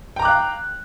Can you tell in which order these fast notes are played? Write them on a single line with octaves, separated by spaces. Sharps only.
G5 A#5 D6 F#6 F5